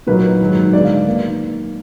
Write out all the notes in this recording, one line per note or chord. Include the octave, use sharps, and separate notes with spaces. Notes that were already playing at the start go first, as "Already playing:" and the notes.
A#2 F#3 A#3 D#4 B4
G#2 D#3 F#3
D3 G#3 B3 D#4 D5
F5
D#3 A#3